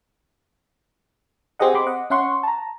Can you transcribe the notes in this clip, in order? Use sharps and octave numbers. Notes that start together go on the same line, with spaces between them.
C4 G4 G#4 D#5 F#5
C4 B5 C6 D6
D#5 F#5
C#4 E5 F#5 C6 C#6
A5 A#5